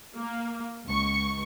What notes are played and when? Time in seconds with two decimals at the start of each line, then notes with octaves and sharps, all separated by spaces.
0.18 A#3
0.86 C#2 C#6